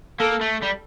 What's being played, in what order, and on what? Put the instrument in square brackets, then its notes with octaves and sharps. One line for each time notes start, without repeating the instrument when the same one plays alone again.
[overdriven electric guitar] A#3 [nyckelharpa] A4
[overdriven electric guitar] A3
G3